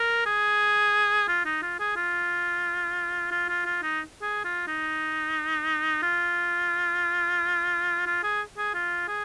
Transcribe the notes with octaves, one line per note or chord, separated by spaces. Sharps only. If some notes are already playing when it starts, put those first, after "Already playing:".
Already playing: A#4
G#4
F4
D#4
F4
G#4
F4
F4
F4
F4
D#4
G#4
F4
D#4
F4
F4
G#4
G#4
F4
G#4